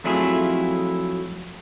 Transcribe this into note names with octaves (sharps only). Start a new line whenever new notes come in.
F2 F#3 A3 E4 F4 G#4